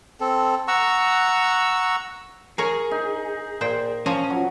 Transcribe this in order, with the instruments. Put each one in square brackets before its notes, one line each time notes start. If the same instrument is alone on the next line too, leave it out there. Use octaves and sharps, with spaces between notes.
[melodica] C4 A4
F#5 A#5 C#6 E6
[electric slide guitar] G#4 [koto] A#4 C#5
[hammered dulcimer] D#4
[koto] A#2 C5 G5
[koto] F3 G#5 A#5 [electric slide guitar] C#4
[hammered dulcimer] F#3